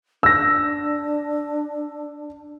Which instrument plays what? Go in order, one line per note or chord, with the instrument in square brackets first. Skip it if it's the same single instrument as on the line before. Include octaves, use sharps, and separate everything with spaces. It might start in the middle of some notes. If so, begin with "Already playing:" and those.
[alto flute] D4 [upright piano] E6 A#6